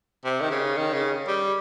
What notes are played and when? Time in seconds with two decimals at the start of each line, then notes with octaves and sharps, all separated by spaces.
0.25 C3
0.41 D#3
0.51 C#3
0.77 D#3
0.93 C#3
1.27 G3